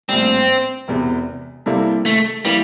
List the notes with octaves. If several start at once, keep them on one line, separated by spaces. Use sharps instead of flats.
A#1 A2 G3 C4
E1 E2 C3
C3 G3 A#3 E4 A4
A3
E3 G3 A#3 E4